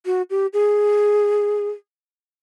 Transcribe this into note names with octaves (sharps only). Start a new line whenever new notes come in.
F#4
G4
G#4